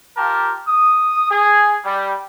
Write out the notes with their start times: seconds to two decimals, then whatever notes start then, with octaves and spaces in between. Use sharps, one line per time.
0.17 F4 G4 A#4 F5 A5
0.68 D#6
1.31 G#4
1.84 G3